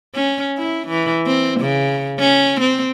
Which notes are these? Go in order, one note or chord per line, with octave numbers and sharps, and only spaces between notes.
C#4
E4
E3
C4
C#3
C#4
C4